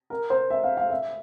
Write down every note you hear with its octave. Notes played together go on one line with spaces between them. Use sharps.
A#4
C5
E5
F5
F5
E5